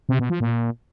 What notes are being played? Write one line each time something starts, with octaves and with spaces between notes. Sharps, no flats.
C3
B2
F3
A#2